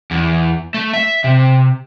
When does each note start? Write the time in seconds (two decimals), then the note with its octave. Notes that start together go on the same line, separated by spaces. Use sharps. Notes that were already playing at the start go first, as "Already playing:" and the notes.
0.11 E2
0.74 A3
0.94 E5
1.24 C3